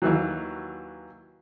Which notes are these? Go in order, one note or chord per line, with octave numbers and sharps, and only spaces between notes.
D#2 E3 F#3